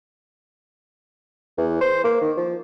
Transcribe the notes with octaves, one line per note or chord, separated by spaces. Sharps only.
E2
C5
A#3
D#3
F3